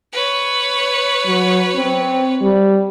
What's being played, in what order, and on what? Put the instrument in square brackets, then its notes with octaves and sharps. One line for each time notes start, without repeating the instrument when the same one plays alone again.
[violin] B4 C#5
[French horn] F#3
C4
G3